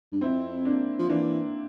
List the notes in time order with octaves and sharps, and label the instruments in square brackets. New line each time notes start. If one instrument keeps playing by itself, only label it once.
[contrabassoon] G2
[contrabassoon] F2 [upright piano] C4 E4
[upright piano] A#3 D4
[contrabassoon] F3
[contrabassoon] E3 [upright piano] A#3 D4